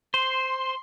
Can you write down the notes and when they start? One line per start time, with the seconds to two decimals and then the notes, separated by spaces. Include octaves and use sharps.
0.14 C5 C6